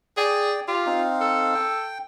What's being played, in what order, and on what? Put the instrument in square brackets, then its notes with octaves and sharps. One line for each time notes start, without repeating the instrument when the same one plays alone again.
[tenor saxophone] G#4 [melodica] D5 G5
[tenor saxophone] F4 [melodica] G4
[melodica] C4 D#4 F5
[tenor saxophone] A4
[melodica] G5